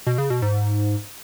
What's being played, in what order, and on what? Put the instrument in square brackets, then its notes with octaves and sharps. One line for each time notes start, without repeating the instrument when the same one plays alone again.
[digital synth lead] B2
C#3
B2
G#2